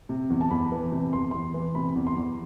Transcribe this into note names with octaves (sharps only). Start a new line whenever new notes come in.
C3
E2
A5
E2 B5
E3
C3
E2 C6
E2 C6
E3
C3 B5
E2
C6
E2